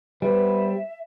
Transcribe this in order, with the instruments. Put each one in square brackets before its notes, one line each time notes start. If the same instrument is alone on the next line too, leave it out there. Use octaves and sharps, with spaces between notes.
[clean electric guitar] G3 [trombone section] B3 C4 B4 [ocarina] E5